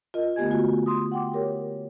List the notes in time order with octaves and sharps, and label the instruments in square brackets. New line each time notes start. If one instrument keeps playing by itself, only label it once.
[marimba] F4 A#4 D#5
D3 A3 B3 G4 G#5 G#6
G#3 F4 F#4 G#5
C6 D#6
F#5 G5 D6
G4 A#4 C#5